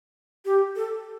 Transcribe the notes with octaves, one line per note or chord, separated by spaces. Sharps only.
G4
A4